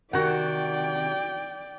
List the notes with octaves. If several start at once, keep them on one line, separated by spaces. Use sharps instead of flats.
C3 D#3 F#4 D5 F#5 G5